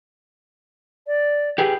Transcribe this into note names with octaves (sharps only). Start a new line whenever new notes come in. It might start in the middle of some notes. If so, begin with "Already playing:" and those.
D5
G4 G#4 B4